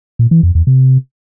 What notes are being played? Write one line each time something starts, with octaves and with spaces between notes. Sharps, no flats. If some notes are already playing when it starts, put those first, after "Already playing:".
A#2
E3
F2
E2
C3